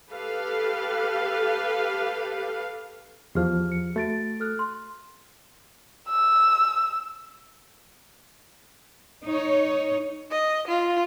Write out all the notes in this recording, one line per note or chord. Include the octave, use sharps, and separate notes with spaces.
G4 A4 B4 F5
E2 F3 G4 G#4 F6
C#7
A3 F#4 A6 D7
A4 F6 F#6
C6
E6
D#4 C#5
D#5
F4